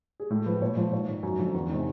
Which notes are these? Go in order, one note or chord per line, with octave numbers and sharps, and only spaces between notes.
G#4
A2 A4
F3 B4
A#2 C#5
F3
G#2 C#5
D#3
F#2
D3 F3
E2
C3 D#3